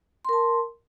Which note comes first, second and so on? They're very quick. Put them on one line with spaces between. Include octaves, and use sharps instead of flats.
C6 A#4 A5